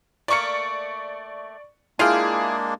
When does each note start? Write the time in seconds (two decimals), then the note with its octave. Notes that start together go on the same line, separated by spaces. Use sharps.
0.28 A3 A#3 D5 C#6 C#7
1.99 G#3 A#3 D4 E4 F4 G#4 F5 G5